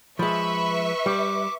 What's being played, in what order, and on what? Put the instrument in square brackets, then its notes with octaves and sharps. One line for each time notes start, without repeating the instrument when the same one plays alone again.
[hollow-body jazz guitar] F3 G#3 [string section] B4 E5 C#6 [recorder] B5
[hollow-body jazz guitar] G3 [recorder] D6